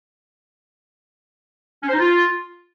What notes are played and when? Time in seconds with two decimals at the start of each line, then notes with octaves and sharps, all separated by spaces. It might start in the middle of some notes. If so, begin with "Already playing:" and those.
1.83 C#4
1.88 C5
1.93 D#4
1.98 F4